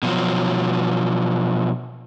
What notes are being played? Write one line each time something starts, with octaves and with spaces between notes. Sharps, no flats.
B2 F3 F#3